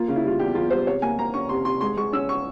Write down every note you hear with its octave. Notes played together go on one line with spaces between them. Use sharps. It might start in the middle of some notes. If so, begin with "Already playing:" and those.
Already playing: A#3 F4
C#3
E4
G3 F4
E2 G4
E2 F4
G3 C5
C3 C#5
A#3 G#5
A#3 A#5
C#4 C#6
C3 C6
C3 C6
G#3 C6
G#3 C#6
C#4 E6
C#6